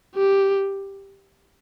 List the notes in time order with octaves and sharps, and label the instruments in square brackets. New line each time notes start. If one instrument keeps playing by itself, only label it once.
[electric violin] G4